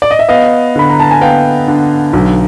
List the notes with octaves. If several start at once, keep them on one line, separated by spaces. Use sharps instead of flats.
D5
D#5
E5
B3 D#5 F5
D3 B5
A#5
A5
G#5
B3 F5 G5
D3
B1